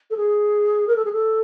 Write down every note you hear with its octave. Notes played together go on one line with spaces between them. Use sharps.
A4
G#4
A#4
A4
G#4
A4